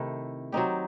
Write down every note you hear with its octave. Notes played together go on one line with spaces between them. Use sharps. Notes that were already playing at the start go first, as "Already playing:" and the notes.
Already playing: C3 D#3 A3 E4
F#3 C4 D#4 G4